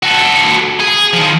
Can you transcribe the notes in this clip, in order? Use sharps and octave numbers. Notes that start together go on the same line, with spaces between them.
F#4 A4
G#4
D#3 F3